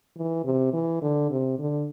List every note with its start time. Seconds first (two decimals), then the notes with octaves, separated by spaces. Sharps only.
0.17 E3
0.44 C3
0.73 E3
1.02 D3
1.30 C3
1.59 D3